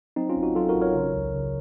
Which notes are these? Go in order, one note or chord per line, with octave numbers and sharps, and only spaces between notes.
F#3 C4 D#4
C#4 F4
A1
D#4 F#4
F#3 F4 A4
F#4 A#4
A1
A#4 C#5
C#3
C#2
C#3